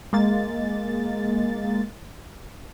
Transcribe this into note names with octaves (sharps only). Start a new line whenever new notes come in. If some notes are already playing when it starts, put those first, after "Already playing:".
G#3 A#3 A6